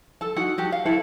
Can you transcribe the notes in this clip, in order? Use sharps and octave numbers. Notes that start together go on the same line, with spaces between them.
A4 A5
D#4 F#4 F#5
F#4 G4 A5
F5
E4 A4 B4